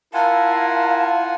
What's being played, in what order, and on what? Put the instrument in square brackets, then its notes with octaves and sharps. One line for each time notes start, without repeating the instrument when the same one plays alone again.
[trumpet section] E4 A#4 [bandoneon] F4 F#5 G#5 [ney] F5 [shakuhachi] A5